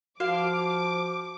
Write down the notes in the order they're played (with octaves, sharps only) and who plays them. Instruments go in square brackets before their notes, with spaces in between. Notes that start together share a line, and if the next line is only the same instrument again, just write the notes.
[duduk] F3 [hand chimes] F#4 [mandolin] F5 [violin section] D6